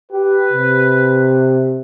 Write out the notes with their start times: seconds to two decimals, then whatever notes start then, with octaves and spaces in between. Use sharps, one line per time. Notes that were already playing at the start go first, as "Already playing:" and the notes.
0.11 G4 B4
0.53 C3